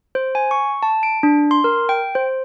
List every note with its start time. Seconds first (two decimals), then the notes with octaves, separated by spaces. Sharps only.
0.15 C5
0.35 G#5
0.51 C#6
0.83 A5
1.03 D7
1.23 D4
1.51 C6
1.64 A#4
1.89 G5
2.15 C5